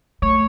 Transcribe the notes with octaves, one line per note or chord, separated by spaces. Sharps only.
A3 C#5